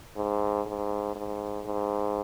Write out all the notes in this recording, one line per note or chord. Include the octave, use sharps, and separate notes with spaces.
G#2
G#2
G#2
G#2